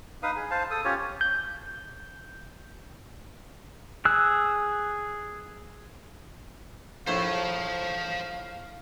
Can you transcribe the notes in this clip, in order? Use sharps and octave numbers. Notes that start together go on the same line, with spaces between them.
D#4 B4 F5 D#6
G#4
C5 F5 A5
A4 D#6
C#4 F4 G4 C#5
G6
G#4 E6 F#6
A#1 A2 A3 C5 C#5 F5 A5 E6